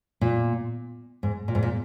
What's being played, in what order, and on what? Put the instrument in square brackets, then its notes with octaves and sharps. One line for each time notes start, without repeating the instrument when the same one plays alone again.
[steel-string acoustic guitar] A#2
G#2
A#2
G#2
A#2